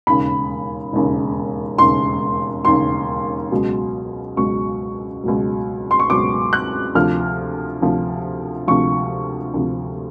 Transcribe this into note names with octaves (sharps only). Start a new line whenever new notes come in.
E1 D#2 C#3 B5
E1 D#2 C#3
E1 D#2 C#3 C6
E1 D#2 C#3 C6
C#2 B2 F#3
C#2 B2 F#3 C#6
C#2 B2 F#3
C6
C#6
C#2 B2 F#3 D6
F#6
D2 C3 F3 F6
D2 C3 F3
D2 C3 F3 C#6
D2 C3 F3